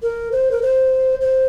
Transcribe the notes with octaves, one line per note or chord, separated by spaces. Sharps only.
A#4
C5
A#4
C5
C5